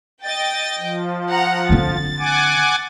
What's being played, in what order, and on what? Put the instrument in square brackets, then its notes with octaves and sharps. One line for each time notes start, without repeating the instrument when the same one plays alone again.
[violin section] D#5 G5 [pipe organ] A6
[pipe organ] F3
[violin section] F#5 A#5
[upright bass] D3 C4 [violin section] A6
[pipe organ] F#5 G#5 D6